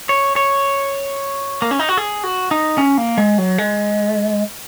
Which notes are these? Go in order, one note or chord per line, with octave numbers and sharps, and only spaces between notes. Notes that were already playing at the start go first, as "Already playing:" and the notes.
C#5
C#5
A#3
C#4
D#4
F#4
G#4
F#4
D#4
C#4
A#3
G#3
F#3
G#3